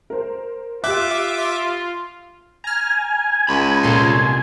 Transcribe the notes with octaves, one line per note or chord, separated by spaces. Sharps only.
A#4 C5
F4 G4 E5 D6 F#6
G#5 A#5 F6
C#2 B5
C2 A#2 A4 C6